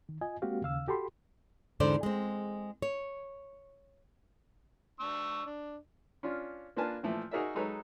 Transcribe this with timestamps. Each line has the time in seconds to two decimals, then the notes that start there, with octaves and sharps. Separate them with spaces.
0.09 D#3
0.21 F4 D#5 G#5
0.42 G#3 A#3 C4 F#4 G4 F5
0.62 D#2 C#3 F5 E6
0.88 F#4 G4 A4 B5 C6
1.80 E2 G#2 D3 C5 D5
2.03 G#3 C4
2.82 C#5
5.00 D4 C#6 E6
5.46 D4
6.23 C#4 D4 F4
6.77 A#3 D4 F4 B4 G#5 A5
7.03 A#2 E3 F3 A3
7.31 D#4 F#4 G#4 A#4 D5 E5
7.55 F#3 G#3 D#4 A4 B4 C#5